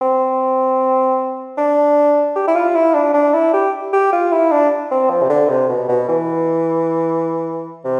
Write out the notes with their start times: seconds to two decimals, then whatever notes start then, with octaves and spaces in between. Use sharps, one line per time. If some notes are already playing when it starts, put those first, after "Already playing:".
0.01 C4
1.58 D4
2.35 G4
2.47 E4
2.55 F4
2.75 E4
2.94 D4
3.14 D4
3.34 E4
3.53 G4
3.93 G4
4.13 F4
4.32 E4
4.52 D4
4.91 C4
5.10 F3
5.23 C3
5.29 D3
5.49 C3
5.69 B2
5.89 B2
6.09 E3
7.85 C3